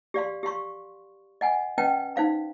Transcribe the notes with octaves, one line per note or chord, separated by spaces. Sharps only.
G4 D5 F5 C6
G4 F5 C6 C#6
D#5 F#5 G#5
C#4 B4 D#5 F#5 G5 A5
D#4 C5 F5 B5